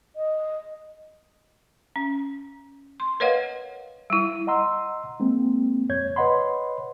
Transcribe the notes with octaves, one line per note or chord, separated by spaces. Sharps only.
D#5
C#4
C6
A#4 B4 C#5 D#5 F5 F#5
G3 E4
D#5 F#5 A#5 C6 E6
G#3 A#3 C4
F2 C#5 G6 G#6
B4 C#5 D#5 F#5 B5 C6